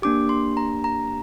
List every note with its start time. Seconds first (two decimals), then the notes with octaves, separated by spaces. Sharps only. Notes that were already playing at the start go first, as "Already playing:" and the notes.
0.02 A#3 D4 G4 D6
0.29 C6
0.57 A#5
0.84 A#5